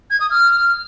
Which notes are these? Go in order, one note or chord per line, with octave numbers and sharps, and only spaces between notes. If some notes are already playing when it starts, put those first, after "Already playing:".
G#6
D#6
F6